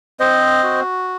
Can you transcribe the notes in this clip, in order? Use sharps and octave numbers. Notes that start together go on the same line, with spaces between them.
C4 C5 D#5
F#4